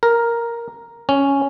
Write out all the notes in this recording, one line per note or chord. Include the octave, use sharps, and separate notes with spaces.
A#4
C#4